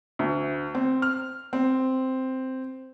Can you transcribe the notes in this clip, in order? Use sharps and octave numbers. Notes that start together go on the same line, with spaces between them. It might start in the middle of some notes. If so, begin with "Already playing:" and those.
D2
C4
F6
C4